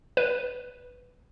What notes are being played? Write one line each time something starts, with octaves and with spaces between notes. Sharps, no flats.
B4